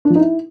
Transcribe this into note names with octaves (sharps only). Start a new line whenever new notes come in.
D4
F3
D#4
E4